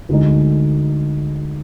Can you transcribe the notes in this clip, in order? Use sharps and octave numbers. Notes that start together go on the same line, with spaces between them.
D2 D3 G#3 D#4